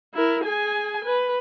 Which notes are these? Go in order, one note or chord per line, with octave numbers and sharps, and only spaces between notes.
E4 A#4
G#4 G#5
B4